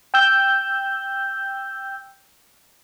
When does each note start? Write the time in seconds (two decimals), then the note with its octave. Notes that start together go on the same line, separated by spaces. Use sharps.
0.14 G5 E6 G6